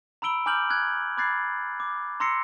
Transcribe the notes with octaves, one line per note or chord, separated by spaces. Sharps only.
A#5 B5 E6 D7 G7
G#5 A#5 D6 F6 G6 F#7
F#6 G#6
B5 D6 F#6 G#6 A6 C7
D6
A#5 C6 E6 A#6 C7 C#7